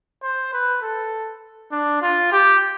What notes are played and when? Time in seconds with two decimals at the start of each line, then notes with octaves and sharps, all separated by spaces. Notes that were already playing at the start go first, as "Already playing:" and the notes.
0.23 C5
0.53 B4
0.82 A4
1.72 D4
2.02 F4
2.32 G4